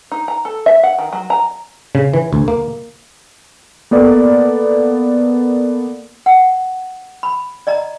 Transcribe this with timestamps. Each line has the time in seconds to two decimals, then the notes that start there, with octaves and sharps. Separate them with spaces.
0.12 D#4
0.28 A#5
0.45 A4
0.66 E5
0.83 F#5
0.98 D#3
1.13 F#3
1.30 A#5
1.95 C#3
2.13 E3
2.33 D2
2.48 A#3
3.91 A#3 B3 A4 D5
6.26 F#5
7.23 B5
7.67 D5 D#5 A#5